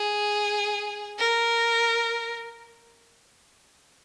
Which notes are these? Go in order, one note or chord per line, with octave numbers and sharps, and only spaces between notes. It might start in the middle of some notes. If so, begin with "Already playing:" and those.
Already playing: G#4
A#4